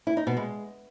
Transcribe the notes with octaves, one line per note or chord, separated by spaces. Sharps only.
E4
D#4
B2
G#3